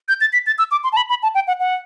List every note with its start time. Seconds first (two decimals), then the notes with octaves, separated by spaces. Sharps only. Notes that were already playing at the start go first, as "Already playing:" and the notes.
0.08 G6
0.21 A6
0.33 B6
0.47 A6
0.58 E6
0.71 D6
0.84 C6
0.93 A5
0.97 B5
1.10 B5
1.23 A5
1.35 G5
1.48 F#5
1.60 F#5